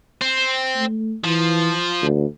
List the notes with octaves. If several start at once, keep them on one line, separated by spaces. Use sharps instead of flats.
C4
A3
E3 F3
D2